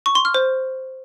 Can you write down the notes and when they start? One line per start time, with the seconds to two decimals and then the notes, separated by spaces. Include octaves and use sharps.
0.06 C#6
0.15 C6
0.25 F6
0.34 C5